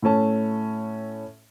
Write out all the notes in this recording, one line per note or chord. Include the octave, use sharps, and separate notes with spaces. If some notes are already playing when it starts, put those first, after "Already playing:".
A2 A3 C#4 A5